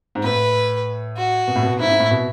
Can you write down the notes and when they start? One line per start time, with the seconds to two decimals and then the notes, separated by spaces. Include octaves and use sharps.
0.15 G#2
0.23 A2 B4
1.17 F#4
1.48 B2
1.56 A2
1.63 B2
1.79 G#2 E4
1.89 G#2
1.99 A2
2.11 B2